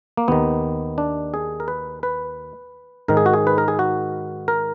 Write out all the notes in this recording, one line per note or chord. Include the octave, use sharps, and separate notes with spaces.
A#3
D#2 D#3 B3
D4
G#4
A#4
B4
B4
G#2 D#3 A#4
G#4
F#4
G#4
B4
A#4
G#4
F#4
A#4